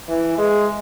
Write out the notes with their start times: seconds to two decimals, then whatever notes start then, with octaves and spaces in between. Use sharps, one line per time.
0.09 E3
0.38 G#3